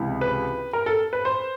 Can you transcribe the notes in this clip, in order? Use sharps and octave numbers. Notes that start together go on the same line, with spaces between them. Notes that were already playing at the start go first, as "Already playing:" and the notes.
Already playing: C#2 C3 E3
B4
A#4
A4
B4
C5